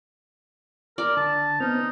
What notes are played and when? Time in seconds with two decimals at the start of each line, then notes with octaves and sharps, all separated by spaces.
0.98 A#4 D5
1.17 D3 A5
1.60 B3 C4 D#4 F6